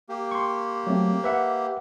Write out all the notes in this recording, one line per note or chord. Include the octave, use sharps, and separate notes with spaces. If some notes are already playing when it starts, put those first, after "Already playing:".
A#3 G4
C6 C#6
F#3 A3 C4
B4 E5 F#5